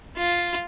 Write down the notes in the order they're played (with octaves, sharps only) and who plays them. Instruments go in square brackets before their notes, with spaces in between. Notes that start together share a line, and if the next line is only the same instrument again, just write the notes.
[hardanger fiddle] F4